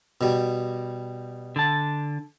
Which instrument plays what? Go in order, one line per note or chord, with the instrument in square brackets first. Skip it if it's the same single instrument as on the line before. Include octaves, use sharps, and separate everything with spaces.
[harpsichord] B2 G3
[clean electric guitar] D3 A5